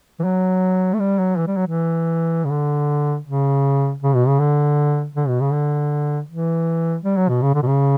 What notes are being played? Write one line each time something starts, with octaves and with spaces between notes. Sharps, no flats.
E3
F#3
A3
G3
F#3
E3
G3
F#3
E3
C#3
D3
C#3
C#3
B2
C#3
D3
D3
B2
C#3
D3
E3
G3
F#3
B2
C#3
D3
B2
C#3